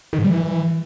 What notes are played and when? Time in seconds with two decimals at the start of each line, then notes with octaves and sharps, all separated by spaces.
0.13 D#3
0.19 G#2
0.24 G3
0.30 E3